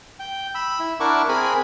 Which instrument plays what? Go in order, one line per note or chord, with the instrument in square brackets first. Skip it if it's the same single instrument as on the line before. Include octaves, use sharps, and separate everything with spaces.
[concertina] G5
B5 E6
E4
D4 E4 A#4 F#5 C#6 D6
C4 G#4 A#4 G#5 B5